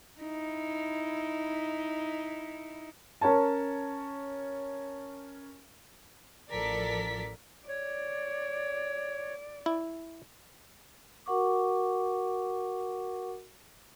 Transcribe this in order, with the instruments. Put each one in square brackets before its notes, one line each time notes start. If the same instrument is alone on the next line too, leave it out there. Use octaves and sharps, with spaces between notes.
[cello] D#4 E4
[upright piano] C#4 A#4 C#5 A5
[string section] A1 F3 A4 A#4 D5 B6
[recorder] C#5 [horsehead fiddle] D5
[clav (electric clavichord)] E4
[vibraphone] F#4 A#4 F#5 C#6 D6